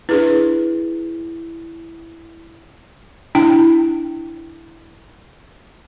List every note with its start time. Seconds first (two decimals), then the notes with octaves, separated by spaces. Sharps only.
0.09 D4 E4 G#4 B4
3.35 D4 E4 G5